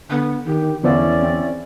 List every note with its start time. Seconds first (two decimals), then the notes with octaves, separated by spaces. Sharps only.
0.10 D3 B3
0.47 D#3 G4
0.83 E2 D3 F3 B3 C#4 E4 D5
1.23 C4